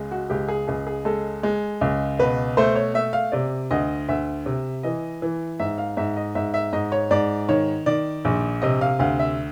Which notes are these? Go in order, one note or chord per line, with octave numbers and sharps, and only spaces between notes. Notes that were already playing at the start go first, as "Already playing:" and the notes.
Already playing: C#2 G#3
F#4
C#2 G4
G#4
C#2 G#4
G#4
G#3 A4
G#3
C#2
B2 B4
A3 C5
C#5
A3 E5
F5
C3 D5
D2 D#5
D2 E5
C3
E3 D#5
E3
G#2 E5
F5
G#2 E5
D#5
G#2 E5
E5
G#2 D#5
C#5
G#2 D5
D#3 C#5
D#3 D5
A#1
C3 D#5
F5
D2 F5
E5